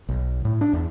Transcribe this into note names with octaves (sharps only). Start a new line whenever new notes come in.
B1
A2
D4
E2